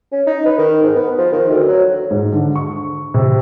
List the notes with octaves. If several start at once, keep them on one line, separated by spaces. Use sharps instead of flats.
C#4
D#4
B4
D#3
G#2
B3
F3
D#3
D2
F#3
G#2
D3
C#6
C3